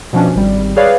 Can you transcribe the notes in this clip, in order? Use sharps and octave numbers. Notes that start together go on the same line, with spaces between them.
B2 F3 C#4 D4
G#1 G3
G#4 B4 C#5 D5 F5